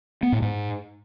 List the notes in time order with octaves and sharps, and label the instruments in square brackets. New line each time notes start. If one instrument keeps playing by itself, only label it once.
[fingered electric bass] B3
A2
G#2